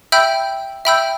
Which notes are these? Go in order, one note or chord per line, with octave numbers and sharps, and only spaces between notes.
E5 G5 B5 E6 G6
E5 G5 B5 E6 G6